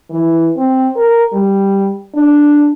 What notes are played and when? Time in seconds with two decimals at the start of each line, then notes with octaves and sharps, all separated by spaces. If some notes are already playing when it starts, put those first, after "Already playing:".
0.10 E3
0.57 C4
0.96 A#4
1.33 G3
2.15 D4